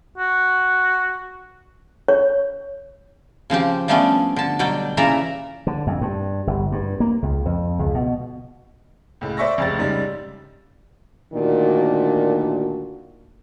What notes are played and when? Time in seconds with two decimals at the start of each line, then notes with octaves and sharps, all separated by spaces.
0.18 F#4
2.08 C#5
3.50 C#3 F3 C4 G4
3.88 F3 G3 A3 B3 C#4 D4
4.36 D3 A5
4.59 B2 F#3 G3 D5 G5
4.97 A#2 C#3 E3 D5 E5 A#5
5.67 D3
5.87 F2
6.01 G2
6.47 G1
6.72 G2
7.00 A#3
7.22 C#2
7.45 F2
7.79 C#2
7.94 B2
9.21 C#2 A2
9.37 C5 D5 E5 C#6 E6 A#6
9.58 F1 C#2 A6
9.79 G#2 C#3 G3
11.33 D2 A#2 D#3 D4 F#4